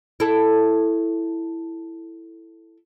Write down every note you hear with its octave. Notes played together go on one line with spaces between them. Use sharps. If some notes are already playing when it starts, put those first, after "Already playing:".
E4 A4